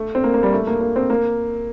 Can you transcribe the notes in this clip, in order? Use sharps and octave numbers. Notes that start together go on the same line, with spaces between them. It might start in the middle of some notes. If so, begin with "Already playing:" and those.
Already playing: A3
C4
A#3
A#3
G3
A3
A#3
A#3
C4
A#3